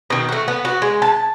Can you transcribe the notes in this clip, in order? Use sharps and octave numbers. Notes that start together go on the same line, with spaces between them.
B2 D#3
A3 F#4
B3
F#4
G#3
A5